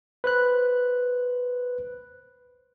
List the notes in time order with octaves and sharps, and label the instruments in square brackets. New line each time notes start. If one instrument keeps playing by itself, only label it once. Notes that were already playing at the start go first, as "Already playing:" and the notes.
[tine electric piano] B4 C5 F#6